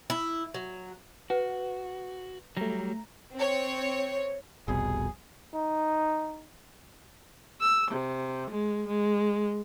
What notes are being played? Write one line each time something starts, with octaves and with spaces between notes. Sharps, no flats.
E4
F#3
F#4 B4 F#5
F#3 G3 A3 A#5
C4 C#5
F1 C2 B2 G#4
D#4
E6
C3
G#3
G#3